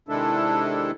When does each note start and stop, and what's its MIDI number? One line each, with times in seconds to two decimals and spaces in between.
0.09 0.91 48
0.09 0.91 51
0.09 0.91 56
0.09 0.91 62
0.09 0.91 64
0.09 0.91 69